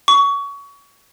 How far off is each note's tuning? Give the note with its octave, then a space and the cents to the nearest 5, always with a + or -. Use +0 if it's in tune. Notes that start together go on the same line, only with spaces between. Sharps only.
C#6 +25